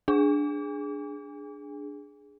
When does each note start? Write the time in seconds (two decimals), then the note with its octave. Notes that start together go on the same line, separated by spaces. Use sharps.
0.08 D4 G#4